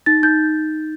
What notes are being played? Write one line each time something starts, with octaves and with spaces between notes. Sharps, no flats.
D#4 A6
D#4 G6